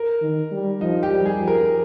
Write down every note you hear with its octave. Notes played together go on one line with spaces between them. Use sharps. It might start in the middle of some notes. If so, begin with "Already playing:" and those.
Already playing: A#4
D#3
G3
F3 D#4
G4
G3
G#4
F3
A#4